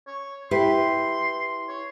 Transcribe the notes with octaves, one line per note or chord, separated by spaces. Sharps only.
C#5
E4 G4 B4 C6
C#5